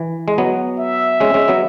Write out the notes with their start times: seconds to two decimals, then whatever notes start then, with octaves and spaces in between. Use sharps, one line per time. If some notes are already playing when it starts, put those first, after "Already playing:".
Already playing: E3
0.28 G#3
0.38 F#3 B3
0.80 E5
1.20 G#3 C#4
1.34 G#3 C#4
1.48 F#3 B3